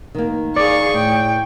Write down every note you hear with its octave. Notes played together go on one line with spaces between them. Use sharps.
D#3 A#3
G#4 D5 F5 C#6
A2 G5